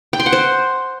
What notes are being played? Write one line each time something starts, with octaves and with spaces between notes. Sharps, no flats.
G5
C6
F#5
C5